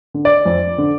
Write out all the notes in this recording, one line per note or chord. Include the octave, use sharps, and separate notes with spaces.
D3
D5
F2
D3